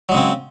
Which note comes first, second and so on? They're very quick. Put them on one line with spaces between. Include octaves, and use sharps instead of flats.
F#3 G#3 C#3 C4